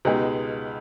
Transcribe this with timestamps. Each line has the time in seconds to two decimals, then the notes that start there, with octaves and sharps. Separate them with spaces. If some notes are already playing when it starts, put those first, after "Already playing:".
0.05 C#2 B2 G#3 D#4 G4